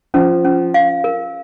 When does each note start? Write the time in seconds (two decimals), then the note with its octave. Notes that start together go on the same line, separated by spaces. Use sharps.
0.14 F3 C#4
0.45 C#4
0.74 F5
1.04 A#4